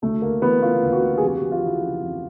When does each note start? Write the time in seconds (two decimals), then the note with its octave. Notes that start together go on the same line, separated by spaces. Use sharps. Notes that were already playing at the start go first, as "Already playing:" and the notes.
0.02 D2 A3
0.22 D2 A#3
0.42 E3 B3
0.62 C#3 F4
0.82 D2
0.92 F#4
1.01 D2
1.18 G#4
1.21 F2 G4
1.37 F#4
1.42 F2
1.52 F4
1.62 E3 E4
1.82 C#3
2.02 F2